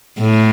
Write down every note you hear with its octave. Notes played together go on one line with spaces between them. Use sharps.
A2